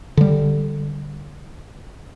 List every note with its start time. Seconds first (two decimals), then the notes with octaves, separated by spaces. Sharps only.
0.17 D3 G3